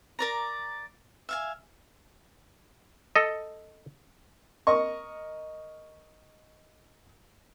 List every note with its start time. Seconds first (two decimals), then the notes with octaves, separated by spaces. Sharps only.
0.19 A#4 D5 A#5
1.29 E5 F5 G#5
3.16 A4 D#5
4.67 A#4 D#5 C#6